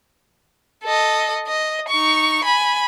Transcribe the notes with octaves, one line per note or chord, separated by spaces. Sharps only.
A4 D#5
D#5
D#4 C#6
G#5 B5